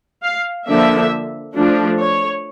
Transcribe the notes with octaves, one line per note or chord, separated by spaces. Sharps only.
F5
D3 F3 A#3 D4 E5
F3 A3 D4
C#5